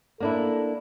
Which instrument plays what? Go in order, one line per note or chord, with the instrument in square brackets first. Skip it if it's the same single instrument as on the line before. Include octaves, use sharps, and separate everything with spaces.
[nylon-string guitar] A#3 D4 E4 [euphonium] A4